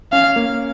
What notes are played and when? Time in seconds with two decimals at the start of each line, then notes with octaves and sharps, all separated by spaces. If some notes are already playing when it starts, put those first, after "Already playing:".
0.12 C#4 F5
0.36 A#3